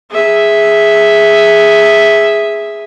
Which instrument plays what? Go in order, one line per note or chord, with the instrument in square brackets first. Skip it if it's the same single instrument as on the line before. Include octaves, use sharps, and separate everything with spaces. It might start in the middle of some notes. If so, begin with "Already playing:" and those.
[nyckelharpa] G#4 E5